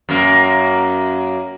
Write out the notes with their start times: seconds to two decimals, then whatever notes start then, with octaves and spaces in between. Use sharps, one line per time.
0.09 F#2 A#3